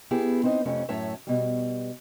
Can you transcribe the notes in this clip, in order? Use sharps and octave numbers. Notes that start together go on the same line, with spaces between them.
B3 E4 G4 G#4
C4 D#4 C5 D#5
F2 C3 F3 A3 C#4
F#2 A2 C#5 E5 A5
B2 G3